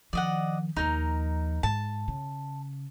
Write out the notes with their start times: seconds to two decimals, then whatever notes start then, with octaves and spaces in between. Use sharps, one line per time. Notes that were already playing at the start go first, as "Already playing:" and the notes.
0.13 D#3 F3 D5 D#5 F#5
0.76 D#2 F3 D#4 A#4
1.63 G#2 A5
2.08 C#3